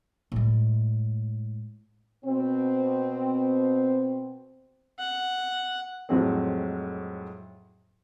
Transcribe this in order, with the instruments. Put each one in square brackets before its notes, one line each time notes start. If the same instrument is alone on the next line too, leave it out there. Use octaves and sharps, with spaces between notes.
[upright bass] A2 G#3
[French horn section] B2 C4
[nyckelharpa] F#5
[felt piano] F2 A2 F#3 G#3 C4